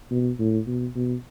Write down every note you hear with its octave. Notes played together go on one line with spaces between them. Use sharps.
B2
A2
B2
B2